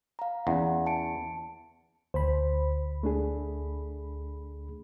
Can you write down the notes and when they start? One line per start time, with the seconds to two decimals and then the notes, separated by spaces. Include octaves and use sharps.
0.19 F5 A#5
0.47 E2 C#4 F#5
0.86 A5 C#7 D7
2.14 D2 C5 B5
3.03 A3 D4 G#4